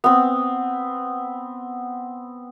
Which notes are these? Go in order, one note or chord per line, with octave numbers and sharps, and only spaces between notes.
B3 C4